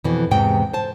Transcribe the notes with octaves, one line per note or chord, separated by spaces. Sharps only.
F2 B2 E3
E2 G#2 C3 G5
C5 A5